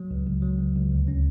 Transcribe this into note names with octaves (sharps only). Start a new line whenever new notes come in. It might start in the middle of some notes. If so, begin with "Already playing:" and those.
Already playing: F#3
C#2
C#2
F#3
C#2
C#2
D2
C#4